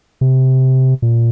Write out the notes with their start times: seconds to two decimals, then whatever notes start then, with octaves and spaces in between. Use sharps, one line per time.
0.21 C3
1.02 A#2